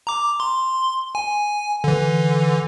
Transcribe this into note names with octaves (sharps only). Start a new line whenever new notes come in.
A#5 D6
C6
G#5
D3 E3